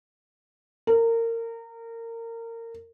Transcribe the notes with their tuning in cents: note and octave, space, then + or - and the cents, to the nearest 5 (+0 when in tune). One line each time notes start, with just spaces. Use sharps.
A#4 -25